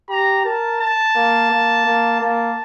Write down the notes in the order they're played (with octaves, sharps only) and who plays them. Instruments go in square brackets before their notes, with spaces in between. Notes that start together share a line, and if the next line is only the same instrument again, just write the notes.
[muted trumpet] G4 [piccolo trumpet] A#5
[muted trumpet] A#4 [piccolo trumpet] A5
[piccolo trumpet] A5
[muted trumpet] A#3
A#3
A#3
[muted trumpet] A#3 [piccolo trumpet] A5